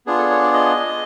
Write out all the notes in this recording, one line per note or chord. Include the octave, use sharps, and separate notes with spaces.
B3 D4 F4 G#4
A4
C#5
D5
D#5